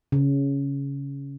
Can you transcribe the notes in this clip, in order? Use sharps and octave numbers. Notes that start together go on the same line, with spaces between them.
C#3